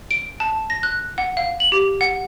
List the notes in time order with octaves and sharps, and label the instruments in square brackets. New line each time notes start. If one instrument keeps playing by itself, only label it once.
[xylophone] D7
A5
A#6
F#6
F#5
F5
F#7
G4
F#5